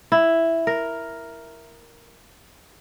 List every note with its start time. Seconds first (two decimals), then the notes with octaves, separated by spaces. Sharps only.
0.12 E4
0.67 A#4